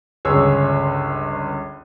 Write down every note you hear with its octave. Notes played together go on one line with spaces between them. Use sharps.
G1 C#2 G#4 C#5 E6